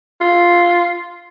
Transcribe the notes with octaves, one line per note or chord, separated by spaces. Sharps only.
F4